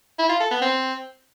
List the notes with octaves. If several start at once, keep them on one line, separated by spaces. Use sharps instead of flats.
E4
F4
A4
B3
C4